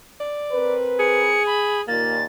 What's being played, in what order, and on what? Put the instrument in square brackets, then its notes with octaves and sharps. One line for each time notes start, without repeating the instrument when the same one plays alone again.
[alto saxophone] D5
[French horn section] C4 A#4 B4
[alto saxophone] G#4 [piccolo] C#7
[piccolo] B5
[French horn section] D#2 A#2 [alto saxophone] A#3 [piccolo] A6